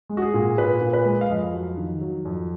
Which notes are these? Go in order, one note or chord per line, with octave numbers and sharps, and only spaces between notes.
G#3
F#4
G#4
A#2
A#2 B4
A#2
B4
G#3
F5
F2 D#5
F#3
D#3
F#3
F2